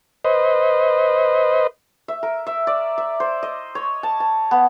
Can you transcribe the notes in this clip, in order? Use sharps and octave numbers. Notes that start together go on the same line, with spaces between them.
B4 C5 D#5
E5
A#4
E5
D5
E5
C5
D#5
C#5
A5
A5
B3